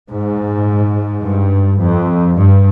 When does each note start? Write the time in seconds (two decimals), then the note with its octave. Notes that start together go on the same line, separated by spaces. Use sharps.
0.12 G#2
1.24 G2
1.80 F2
2.36 G2